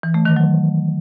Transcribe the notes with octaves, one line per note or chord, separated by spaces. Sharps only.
E3
A3
D#3
F#3